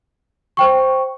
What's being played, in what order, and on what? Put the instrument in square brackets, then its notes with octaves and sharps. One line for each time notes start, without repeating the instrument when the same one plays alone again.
[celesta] C5 G5 C#6